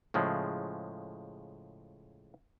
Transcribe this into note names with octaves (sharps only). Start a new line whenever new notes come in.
A2 C#3 F3 G#3